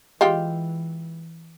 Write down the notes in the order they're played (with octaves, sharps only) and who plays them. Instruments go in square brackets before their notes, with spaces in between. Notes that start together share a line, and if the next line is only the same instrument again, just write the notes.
[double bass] E3 [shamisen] G#3 F4 G4